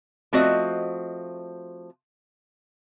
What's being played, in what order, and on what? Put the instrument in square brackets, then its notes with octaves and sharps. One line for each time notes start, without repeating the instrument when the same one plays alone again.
[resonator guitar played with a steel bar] F3 A3 C4 F#4 C5 D#5